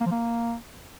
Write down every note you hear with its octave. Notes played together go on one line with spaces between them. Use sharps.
A#3
F3
A#3